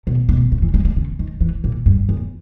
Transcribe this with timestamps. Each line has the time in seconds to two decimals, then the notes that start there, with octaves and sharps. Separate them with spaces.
0.07 B2
0.29 B2
0.52 C#3
0.62 E3
0.74 G#3
0.85 G#3
0.96 C#3
1.19 D#3
1.41 E3
1.64 A#2
1.86 G2
2.09 E2